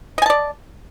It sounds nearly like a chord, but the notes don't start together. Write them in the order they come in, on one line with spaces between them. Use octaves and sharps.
D#5 G#5 A5 D5